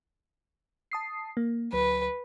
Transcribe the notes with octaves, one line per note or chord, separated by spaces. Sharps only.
A5 D#6 C7
A#3
D2 F#3 B4